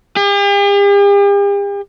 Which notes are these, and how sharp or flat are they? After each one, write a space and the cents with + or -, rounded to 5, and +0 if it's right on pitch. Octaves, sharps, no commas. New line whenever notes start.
G4 +45